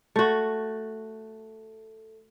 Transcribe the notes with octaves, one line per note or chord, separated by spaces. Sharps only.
A3 F#4